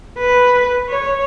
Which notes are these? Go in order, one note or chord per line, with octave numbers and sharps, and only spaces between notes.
B4
C#5